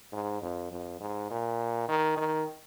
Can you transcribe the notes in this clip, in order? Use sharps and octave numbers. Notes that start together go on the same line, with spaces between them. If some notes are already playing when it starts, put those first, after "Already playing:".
G#2
F2
F2
G#2
A#2
D#3
D#3